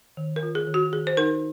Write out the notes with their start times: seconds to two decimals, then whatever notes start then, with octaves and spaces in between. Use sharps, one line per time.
0.17 D#3
0.36 A#4
0.43 F4
0.55 G#4
0.68 D#3
0.74 F#4
0.93 D#3 G#4
1.07 C5
1.17 D#4 A#4